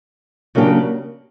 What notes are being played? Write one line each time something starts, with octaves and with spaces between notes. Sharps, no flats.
C#3 F#3 A#3 D4 G4